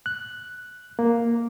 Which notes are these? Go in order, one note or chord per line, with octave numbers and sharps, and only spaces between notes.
F#6
A#3